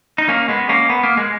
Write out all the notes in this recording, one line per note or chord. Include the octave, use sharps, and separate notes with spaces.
D#4
A#3 C#4
G#3 B3
A#3 C#4
B3
A#3
G#3